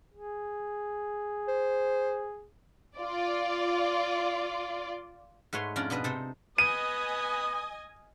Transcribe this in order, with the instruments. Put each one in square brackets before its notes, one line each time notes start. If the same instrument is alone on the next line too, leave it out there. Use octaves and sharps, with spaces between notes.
[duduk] G#4
[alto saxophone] C5
[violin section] F4 D5
[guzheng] G#2 A3 B4 C#5 C6
F2 C#4 D4 F4 D5 A#5
B2 D4 B4 D#5
C3 D#4 A4 C5
[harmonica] B4 D#6 [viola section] D#5 G#5 [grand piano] D#7